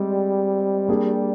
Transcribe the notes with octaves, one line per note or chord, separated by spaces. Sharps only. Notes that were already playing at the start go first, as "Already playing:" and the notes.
Already playing: G3 G#3 C4
A#3 D4 G#4